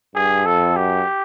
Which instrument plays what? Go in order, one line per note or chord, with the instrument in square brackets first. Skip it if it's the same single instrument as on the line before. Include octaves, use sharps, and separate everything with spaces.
[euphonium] G2 [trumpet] G#4
[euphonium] F2 [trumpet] A4
[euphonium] F#2 [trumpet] G4